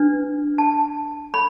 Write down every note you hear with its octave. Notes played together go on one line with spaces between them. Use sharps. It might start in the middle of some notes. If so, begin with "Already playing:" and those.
Already playing: D4 B4
A5
B5